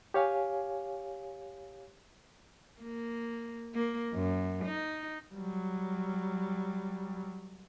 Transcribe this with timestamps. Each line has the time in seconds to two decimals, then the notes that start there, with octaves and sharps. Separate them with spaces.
0.14 G4 C#5 F5 G#5
2.83 A#3
3.75 A#3
4.15 F#2
4.66 D#4
5.34 F#3 G3